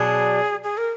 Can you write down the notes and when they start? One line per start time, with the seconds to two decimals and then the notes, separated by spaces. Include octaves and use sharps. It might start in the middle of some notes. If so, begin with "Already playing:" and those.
Already playing: B2 F#3 D4 G#4
0.64 G#4
0.78 A#4